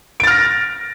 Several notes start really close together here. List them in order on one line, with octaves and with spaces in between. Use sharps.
D7 A6 F6 A#6